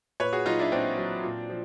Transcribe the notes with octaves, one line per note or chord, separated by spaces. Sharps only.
A#2 B4 C#5
F#4 G#4
F#3 D#4 F4
D4 E4
A#2 C4 D4
F#3
A#2
F3